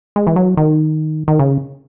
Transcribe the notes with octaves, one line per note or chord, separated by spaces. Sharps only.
G#3
E3
F#3
D#3
D#3
C#3